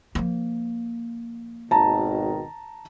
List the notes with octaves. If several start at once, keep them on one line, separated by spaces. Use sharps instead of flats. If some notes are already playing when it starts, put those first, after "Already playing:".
F3 A#3
G#1 B2 D#3 A5 A#5